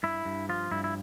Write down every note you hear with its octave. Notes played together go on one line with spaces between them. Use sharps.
G2 E4
G2
F3 F4
G2 E4
E4